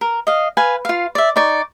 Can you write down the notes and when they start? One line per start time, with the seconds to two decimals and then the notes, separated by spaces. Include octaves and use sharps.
0.01 A#4
0.27 D#5 F5
0.57 B4 F5 G#5
0.85 F4 F5
1.15 D5 E5
1.36 D#4 D5 C#6